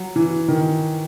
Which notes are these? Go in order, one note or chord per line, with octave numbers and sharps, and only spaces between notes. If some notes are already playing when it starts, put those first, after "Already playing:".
Already playing: F#3
E3
D#3